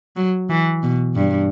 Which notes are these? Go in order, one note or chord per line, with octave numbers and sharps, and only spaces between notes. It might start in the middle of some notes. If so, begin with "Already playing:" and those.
F#3
E3
B2
G2